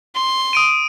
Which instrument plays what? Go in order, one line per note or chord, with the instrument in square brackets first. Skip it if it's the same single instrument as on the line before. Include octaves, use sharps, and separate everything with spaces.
[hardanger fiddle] C6
[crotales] D#6 D7 D#7